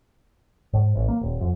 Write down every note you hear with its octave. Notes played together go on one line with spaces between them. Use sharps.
G#2
A1
A#3
D#1
F2